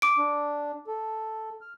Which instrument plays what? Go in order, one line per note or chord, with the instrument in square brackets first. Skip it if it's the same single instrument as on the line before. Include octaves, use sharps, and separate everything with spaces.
[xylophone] D6 D7
[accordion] D4
A4
F6